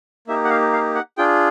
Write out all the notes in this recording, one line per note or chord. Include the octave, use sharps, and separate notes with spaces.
A#3 D#4 G4 E5
F#5
F5
F5
F#5
D4 F4 G#4 G5